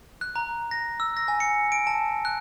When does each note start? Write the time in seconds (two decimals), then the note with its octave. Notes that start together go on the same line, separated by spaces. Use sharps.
0.21 F#6
0.36 A#5
0.71 A#6
1.00 E6
1.17 A#6
1.28 G#5
1.40 C#7
1.72 D7
1.87 A5
2.25 F#6